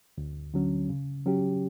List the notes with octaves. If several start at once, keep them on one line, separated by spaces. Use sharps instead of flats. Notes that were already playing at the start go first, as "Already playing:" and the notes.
D2
D3 F#3 C#4
C#3
F#3 C#4 G4